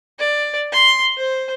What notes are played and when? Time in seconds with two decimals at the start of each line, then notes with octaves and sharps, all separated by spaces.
0.19 D5
0.72 C6
1.17 C5